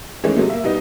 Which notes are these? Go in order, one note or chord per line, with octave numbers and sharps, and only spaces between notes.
D#3 E3 G#3 A3 C#4
C3 F#3 G#3 A3
A#3 E5
B1 G3 B3 D#4